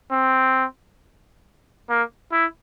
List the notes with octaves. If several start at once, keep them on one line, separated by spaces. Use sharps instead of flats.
C4
A#3
E4